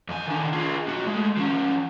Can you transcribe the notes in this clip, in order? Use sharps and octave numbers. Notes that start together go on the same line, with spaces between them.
F2 G#5
D#3 D4
F4 G#4
B1 F#4
G#3 A3
F3 C#4